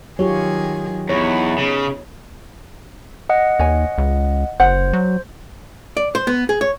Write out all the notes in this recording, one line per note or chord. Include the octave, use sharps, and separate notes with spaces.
D#3 F#3 F4 G4 G#4 C#5
E2 B3 D#4 C#5
C#3
D#5 F#5
D#2 C#5 G#5
C#2
F#1 C5 F#5
F#3
D5
C5
B3
G#4
C#5